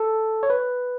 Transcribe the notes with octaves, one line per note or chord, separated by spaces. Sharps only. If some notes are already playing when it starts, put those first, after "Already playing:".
Already playing: A4
C#5
B4